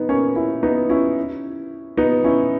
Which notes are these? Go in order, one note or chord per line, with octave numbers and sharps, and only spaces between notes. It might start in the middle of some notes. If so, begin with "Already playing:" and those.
Already playing: B3 D#4
A#3 C#4
C#4 E4
B3 D#4
C#4 E4
B3 D#4
C#4 E4